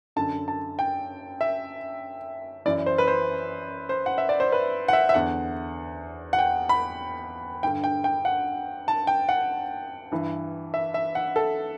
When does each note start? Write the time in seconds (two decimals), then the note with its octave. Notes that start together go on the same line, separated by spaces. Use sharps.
0.16 F#2 D3 A5
0.48 A5
0.79 G5
1.41 E5
2.66 F#2 E3 D5
2.86 C5
2.98 B4
3.08 C5
3.89 C5
4.06 F#5
4.18 E5
4.29 D5
4.40 C5
4.52 B4
4.88 F#5
4.93 E5
5.09 E5
5.14 E2 D3 F#5
6.33 F#5
6.39 G5
6.69 B5
7.63 G2 D3 G5
7.84 G5
8.04 G5
8.25 F#5
8.88 A5
9.07 G5
9.29 F#5
10.12 G2 E3
10.74 E5
10.94 E5
11.15 F#5
11.36 A4